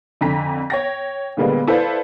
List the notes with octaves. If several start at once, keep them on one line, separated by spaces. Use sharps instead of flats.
F2 D3 G#5 A#5 B6
C#5 G5 A#6
A#2 D3 G3 G#3 A#3 B3
E4 A4 B4 C5 D5 F5